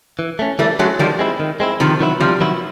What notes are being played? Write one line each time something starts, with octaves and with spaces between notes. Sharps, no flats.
E3
A3 C#4
E3 G3 A3
F#3 G#3 A3 C#4
D#3 F3 G3
G#3 C4 E4
D#3
G#3 C4 E4
C3 D#3 F3
D#3 F#3 B3 E4
C3 F3 G3
D#3 F#3 B3 E4